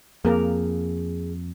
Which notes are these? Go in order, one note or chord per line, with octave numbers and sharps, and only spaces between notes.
F2 A#3 G#4 A#4